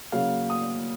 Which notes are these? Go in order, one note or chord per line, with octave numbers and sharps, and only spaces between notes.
C#3 F#3 A#3 F5
D#6